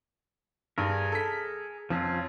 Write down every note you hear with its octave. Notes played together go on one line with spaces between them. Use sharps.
G2 G#4 A#4
A4 B6
F2 F3 C#4 F4